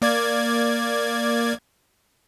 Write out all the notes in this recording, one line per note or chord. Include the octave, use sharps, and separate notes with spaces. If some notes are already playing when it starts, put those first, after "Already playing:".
A#3 D5 G#6